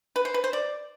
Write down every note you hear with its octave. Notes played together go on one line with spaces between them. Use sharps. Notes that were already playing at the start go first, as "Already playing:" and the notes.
B4
C5
B4
C5
D5